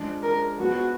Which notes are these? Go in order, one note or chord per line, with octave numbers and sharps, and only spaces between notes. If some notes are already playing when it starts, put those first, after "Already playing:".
Already playing: F3 G#3 D4 G#4
A#4
F3 G#3 B3 F#4